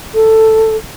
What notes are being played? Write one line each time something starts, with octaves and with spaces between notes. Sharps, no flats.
A4